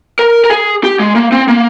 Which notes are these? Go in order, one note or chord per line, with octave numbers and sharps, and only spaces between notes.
A#4
A#4
G#4
G4
G#3
A#3
C4
A#3